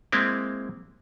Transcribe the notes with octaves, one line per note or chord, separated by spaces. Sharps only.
G#3 A#3 C4 E4